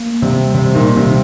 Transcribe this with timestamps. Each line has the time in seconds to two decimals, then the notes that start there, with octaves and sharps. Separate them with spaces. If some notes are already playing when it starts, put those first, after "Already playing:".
Already playing: A#3
0.22 C3 G3
0.54 C3 G3
0.75 A#2 D#3
0.86 G3
0.97 C3